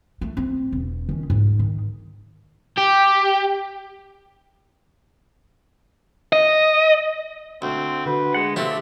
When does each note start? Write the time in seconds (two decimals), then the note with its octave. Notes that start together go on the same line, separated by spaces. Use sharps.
0.21 A3
0.37 C4
0.72 E1
1.09 D#3 C#4
1.30 G#2
1.59 D#3
2.78 G4
6.33 D#5
7.62 D2 C4
8.06 D3 F#4 B4
8.34 G#3 F#5
8.56 F3 A3 C4 D4 G4